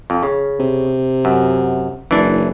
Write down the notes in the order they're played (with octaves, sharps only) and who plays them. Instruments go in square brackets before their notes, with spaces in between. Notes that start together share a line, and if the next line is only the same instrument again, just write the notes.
[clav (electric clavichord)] F2
C#3
[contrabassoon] C3
[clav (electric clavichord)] F#2
[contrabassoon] F#1 [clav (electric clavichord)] E3 D4